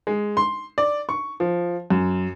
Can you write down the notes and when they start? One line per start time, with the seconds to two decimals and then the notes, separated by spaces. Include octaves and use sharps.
0.07 G#3
0.37 C6
0.78 D5
1.09 C#6
1.40 F3
1.90 F#2